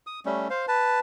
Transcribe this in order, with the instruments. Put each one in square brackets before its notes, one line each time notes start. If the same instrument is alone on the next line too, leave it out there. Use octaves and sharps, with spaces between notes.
[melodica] D#6
G3 A3 C#4
C5 F5
B4 A5